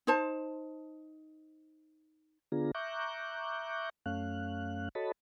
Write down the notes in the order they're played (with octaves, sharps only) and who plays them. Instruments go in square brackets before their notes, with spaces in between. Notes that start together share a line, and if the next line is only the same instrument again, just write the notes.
[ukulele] D#4 C5 A5
[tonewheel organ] D3 B3 D4 F4 G#4 A#5
E5 A#5 C#6 D6 F#6 G6
F#2 A3 C#4 F5 F#6
F#4 A4 C#5 D#5 A5 B5